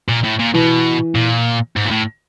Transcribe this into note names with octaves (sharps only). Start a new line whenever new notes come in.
A#2
A2
A#2
B2 E3
A#2
G#2
A#2
A2